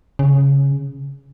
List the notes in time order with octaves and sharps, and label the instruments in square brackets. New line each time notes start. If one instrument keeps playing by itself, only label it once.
[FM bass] C#3